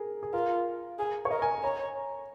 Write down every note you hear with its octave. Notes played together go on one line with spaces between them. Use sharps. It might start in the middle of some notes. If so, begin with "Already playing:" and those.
Already playing: G#4 A#4
G#4
F4 A#4
G#4
C#5
A#4 D#5
G#5
C#5 A#5